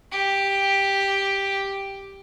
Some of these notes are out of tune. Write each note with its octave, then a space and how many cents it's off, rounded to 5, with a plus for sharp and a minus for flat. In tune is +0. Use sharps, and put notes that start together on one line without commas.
G4 +5